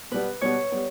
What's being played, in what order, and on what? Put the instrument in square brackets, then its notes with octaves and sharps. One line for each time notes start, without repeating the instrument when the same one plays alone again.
[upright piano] B2 G3 B3 [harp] B4
[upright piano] B2 G3 B3 [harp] C#5
[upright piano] G3 B3